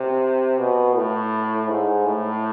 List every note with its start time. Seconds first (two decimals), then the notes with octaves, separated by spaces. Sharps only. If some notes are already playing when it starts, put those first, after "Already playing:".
Already playing: C3
0.58 B2
0.95 A2
1.68 G#2
2.05 A2